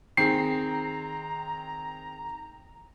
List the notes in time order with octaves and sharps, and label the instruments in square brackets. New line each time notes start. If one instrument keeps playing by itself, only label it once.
[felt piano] D#3 G#4 [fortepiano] C4 [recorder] A#5 [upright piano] C7